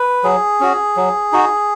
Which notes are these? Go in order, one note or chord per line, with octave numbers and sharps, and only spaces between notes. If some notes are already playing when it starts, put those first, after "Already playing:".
Already playing: B4
F#3 G#4
C#4 F#4
F#3
D#4 F#4